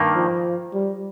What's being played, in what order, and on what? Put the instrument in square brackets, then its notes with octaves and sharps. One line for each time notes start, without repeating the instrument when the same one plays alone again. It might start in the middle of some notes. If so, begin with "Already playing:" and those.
Already playing: [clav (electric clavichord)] G2 D#3 A#3
[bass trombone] F3
G3